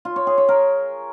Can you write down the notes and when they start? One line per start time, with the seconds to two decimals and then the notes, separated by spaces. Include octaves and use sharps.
0.05 F4
0.16 C#5
0.27 G#4
0.38 C#5
0.49 A#4